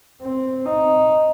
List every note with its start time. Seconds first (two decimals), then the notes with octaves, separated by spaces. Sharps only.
0.22 C4
0.65 D#4